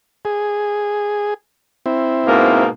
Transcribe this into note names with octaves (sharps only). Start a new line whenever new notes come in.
G#4
C4 E4
G#2 B2 A#3